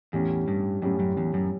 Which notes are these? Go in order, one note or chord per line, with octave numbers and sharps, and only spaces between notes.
E2 A2 G3 C#4 G4
G2
F#2 A2 G3 C#4 G4
F#2
E2
F#2